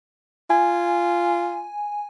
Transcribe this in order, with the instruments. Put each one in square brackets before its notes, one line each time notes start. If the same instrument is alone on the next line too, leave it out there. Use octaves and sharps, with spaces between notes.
[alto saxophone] F4 [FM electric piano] G#5